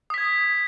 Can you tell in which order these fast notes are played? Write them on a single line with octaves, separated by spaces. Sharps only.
D#6 B6 G#6